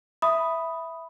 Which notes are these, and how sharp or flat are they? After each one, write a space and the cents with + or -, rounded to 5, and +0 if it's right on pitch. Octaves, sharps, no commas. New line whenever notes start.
E5 +0 B5 +0 D#6 +0